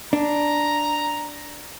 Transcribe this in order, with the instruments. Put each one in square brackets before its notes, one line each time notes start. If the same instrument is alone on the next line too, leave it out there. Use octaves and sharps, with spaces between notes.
[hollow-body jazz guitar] D4 [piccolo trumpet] A#5